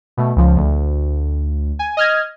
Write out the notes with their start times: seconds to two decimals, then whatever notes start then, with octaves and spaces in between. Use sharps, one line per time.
0.17 B2 A3
0.36 C#2 F3
0.57 D2
1.79 G#5
1.97 D#5 F6 G#6